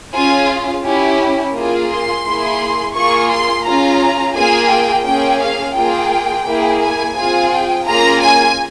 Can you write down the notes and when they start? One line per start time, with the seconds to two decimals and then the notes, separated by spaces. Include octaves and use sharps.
0.14 C#4 F4 G#4 G#5
0.85 C#4 E4 G4
1.55 A#3 F4 G#4
1.90 C6
2.25 A#3 E4 G#4
2.95 A#3 F4 G#4 C#6
3.31 C6
3.65 C#4 F4 G#4 A#5
4.35 A#3 F4 G#4 G#5
4.71 G5
5.06 A#3 C#4 F4 G#4 G5
5.41 F5
5.76 A#3 F4 G#4 G5
6.46 A#3 E4 G#4
6.82 G#5
7.16 C4 F4 G#4 G#5
7.52 G5
7.86 A#3 C#4 F4 G#4 A#5
8.22 G#5